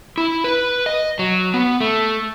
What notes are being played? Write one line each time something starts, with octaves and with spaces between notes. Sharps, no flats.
E4
B4
D#5
F#3
B3
A3